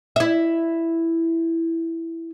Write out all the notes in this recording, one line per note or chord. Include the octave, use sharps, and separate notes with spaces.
E4 E5